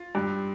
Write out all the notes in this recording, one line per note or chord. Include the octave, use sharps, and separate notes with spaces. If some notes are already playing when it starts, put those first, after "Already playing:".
Already playing: F4
G2